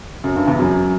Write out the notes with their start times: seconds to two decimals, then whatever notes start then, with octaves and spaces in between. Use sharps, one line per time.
0.24 F#2
0.36 G2
0.47 E2 E3
0.59 F#2 F#3